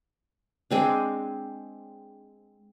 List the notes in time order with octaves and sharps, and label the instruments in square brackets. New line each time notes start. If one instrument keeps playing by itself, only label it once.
[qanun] G#3 C4 D4